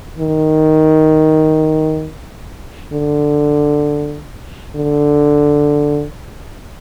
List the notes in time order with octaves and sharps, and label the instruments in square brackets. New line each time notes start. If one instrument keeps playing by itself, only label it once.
[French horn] D#3
D3
D3